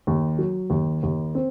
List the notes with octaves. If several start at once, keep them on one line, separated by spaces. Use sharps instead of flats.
D#2
F#3
D#2
D#2
C4